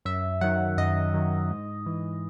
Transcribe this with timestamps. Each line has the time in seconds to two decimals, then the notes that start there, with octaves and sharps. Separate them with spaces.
0.05 F#2 E5
0.41 D#3 F#3 F#5
0.77 F#2 D#5
1.14 D#3 F#3
1.51 G#2
1.86 E3